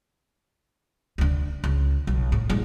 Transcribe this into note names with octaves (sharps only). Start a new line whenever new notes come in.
D2 D3
C#2
B1
A2
A#1 G#2